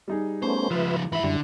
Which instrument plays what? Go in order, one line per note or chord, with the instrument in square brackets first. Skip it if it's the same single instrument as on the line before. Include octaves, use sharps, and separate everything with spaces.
[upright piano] G3 D#4 G#4
[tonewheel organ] A3 B3 C#4 [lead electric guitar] C5
[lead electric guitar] C#2 F3 [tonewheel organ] F4 B4 E5
[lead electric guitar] G#2 B5 [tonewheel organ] E3 [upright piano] E4 E5
[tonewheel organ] F#2 G3 [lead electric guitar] D3